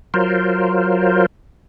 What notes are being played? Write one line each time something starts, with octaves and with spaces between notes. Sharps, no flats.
F#3 F4 A#4 C5